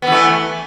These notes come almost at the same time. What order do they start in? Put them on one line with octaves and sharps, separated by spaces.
B3 E3 A3